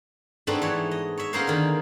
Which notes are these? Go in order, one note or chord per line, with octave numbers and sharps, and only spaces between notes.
G#2 A3 B3 C4 D4 B4
E3 C#5
D#5
C#5 E5
A#3 B3 C#4 G#4 A#4 C5
D3 D#3